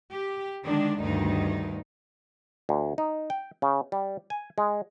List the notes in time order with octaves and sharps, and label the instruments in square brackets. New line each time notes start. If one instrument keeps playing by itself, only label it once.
[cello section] G4
D3 D#3 G#3 D4
D2 G2 D#3 D#4
[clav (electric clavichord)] D2
D#4
G5
C#3
G3
G#5
G#3